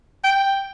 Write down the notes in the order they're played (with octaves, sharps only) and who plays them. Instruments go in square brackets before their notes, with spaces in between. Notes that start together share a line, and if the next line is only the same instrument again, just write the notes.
[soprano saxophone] G5